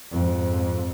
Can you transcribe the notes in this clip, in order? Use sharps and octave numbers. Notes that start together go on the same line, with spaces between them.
F2 G#2